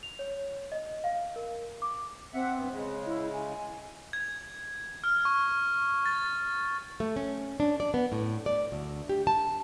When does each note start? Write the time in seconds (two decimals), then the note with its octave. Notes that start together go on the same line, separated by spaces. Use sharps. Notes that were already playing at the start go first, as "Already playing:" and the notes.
0.03 F7
0.19 C#5
0.72 D#5
1.04 F5
1.36 A#4
1.82 D6
2.34 C4 E5 F#5
2.55 G2 B3
2.72 C#3 G#3 D#5
3.06 E4
3.33 G#5
4.13 G#6
5.04 F6
5.25 C#6
6.06 A6
7.00 A3
7.16 C#4
7.60 D4
7.80 D5
7.94 B3
8.12 A2
8.46 D5
8.72 D2
9.09 G4
9.27 A5